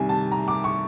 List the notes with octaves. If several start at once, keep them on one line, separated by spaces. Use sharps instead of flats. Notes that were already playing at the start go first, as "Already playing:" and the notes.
Already playing: C2 C3 D#3 G3 G#5
A5
A#5
D6
C#6